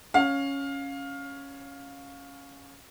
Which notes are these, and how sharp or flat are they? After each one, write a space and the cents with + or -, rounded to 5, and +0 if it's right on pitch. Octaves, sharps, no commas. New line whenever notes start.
C#4 +0 F5 +15